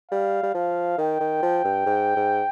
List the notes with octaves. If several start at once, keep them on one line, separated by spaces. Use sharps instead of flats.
G3 F5
G3
F3 F5
D#3 G5
D#3
F3
G2
G#2
G#2